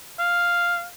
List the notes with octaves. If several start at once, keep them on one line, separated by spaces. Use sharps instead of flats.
F5